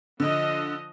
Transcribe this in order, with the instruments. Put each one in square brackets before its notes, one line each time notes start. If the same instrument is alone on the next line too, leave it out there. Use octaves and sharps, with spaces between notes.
[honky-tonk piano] D3 [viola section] F3 D#5